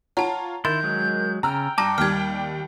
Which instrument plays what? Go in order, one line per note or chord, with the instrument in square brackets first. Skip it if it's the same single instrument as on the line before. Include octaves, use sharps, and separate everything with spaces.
[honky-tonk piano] F4 C#5 A#5 [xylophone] F#5 A5
[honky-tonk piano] D#3 [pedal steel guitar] E4 C6 [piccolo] G6 [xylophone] A6
[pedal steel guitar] F#3 G#3
[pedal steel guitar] C#3 [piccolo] G5 [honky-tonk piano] A#5 E6 F6
[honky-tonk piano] G2 [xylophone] A5 A#5 A#6 [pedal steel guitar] D6
[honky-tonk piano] D#2 G3 [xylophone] F6 G#6